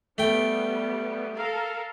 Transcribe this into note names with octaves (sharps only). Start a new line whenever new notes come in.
G3 A3 B3 G5
A4 A#4 F5